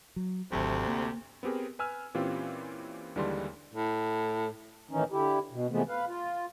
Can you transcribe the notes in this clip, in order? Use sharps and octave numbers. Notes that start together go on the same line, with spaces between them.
F#3
G#1 D2 C3 F#3
A#3
B3 C4 G4 G#4 A#4
B4 G#5 E6 F6
A#2 E3 C4 C#4 F4 G4
D#2 D3 E3 G3 G#3 C6
A2
A2 D#3 E3 C#4 D#4
D3 E4 G4
B2
C3 E3 F3 G#3 A3 B3
B4 F5
F4